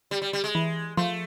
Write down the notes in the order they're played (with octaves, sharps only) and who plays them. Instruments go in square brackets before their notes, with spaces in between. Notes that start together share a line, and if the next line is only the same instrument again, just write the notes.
[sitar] G3
G3
G3
G#3
[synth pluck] E3
[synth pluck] F3 [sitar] A3